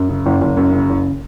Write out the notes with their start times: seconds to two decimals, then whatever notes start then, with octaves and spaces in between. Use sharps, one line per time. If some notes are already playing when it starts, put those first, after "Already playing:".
Already playing: F#2
0.09 C#3
0.26 F#1
0.41 F#1
0.57 F#2
0.73 C#3
0.89 F#1